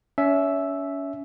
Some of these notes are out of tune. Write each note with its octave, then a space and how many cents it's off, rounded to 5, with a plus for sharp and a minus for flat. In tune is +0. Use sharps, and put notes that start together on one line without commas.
C#4 +30 E5 +0